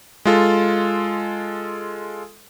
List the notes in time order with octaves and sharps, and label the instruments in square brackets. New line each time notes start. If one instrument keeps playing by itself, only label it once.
[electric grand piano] G#3 F4 A4